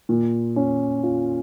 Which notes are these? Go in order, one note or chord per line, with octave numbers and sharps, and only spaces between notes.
A#2
C#4
F4